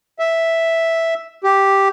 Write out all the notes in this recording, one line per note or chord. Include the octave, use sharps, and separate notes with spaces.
E5
G4